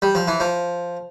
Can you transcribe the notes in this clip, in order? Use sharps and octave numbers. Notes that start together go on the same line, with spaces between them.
G3
F3
E3
F3